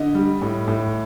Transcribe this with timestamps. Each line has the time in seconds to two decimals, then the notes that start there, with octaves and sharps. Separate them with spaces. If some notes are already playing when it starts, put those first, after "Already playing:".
Already playing: D3 D#5
0.14 G3
0.42 A2
0.68 A2